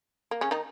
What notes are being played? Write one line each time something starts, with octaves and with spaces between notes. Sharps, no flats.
A#3
C#3 C#4
D#3 D#4